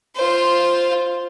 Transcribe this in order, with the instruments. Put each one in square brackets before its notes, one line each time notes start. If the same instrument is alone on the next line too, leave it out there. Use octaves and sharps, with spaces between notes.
[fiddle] F4 C5